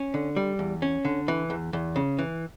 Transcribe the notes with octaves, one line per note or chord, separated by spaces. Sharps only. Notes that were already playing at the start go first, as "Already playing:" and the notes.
Already playing: C#4
D3
G3
E2
C#4
D3
E3
E2
E2
C#3
E3